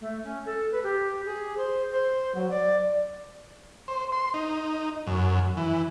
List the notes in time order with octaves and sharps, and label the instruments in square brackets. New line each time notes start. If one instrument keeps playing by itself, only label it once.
[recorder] A3
C#4
A4
B4
G4
G#4
C5
C5
F#3
D5
[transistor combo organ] C5
C6
D#4
F#2
E3